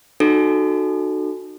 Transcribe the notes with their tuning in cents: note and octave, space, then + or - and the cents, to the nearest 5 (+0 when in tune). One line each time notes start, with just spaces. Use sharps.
D#4 -40 F#4 +0 A4 +0